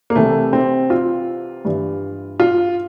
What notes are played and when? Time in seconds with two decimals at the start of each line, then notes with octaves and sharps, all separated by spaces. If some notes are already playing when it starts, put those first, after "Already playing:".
0.10 A#3
0.15 C2 C3 E3 A3
0.53 C4
0.90 F4
1.65 G2 E3
2.40 F4